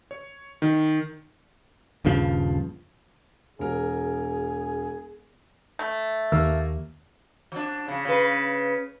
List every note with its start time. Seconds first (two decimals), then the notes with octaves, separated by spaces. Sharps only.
0.11 C#5
0.62 D#3
2.05 D#1 G2 C#3 F3
3.59 E1 G#4 A#4
5.79 A3
6.32 D#2 A#3 A#4 E6
7.52 F3 D4
7.88 C#3
8.05 C#3 B4